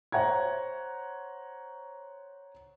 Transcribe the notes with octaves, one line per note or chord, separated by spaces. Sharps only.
C5 C#5 F#5 A#5 G#6